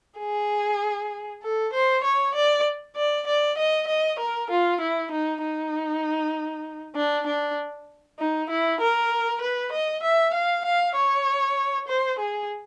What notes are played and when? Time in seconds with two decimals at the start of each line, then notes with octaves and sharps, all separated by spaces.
0.19 G#4
1.43 A4
1.73 C5
2.03 C#5
2.35 D5
2.96 D5
3.27 D5
3.58 D#5
3.88 D#5
4.19 A#4
4.50 F4
4.81 E4
5.11 D#4
5.42 D#4
6.96 D4
7.26 D4
8.18 D#4
8.49 E4
8.81 A#4
9.41 B4
9.72 D#5
10.03 E5
10.34 F5
10.65 F5
10.95 C#5
11.88 C5
12.18 G#4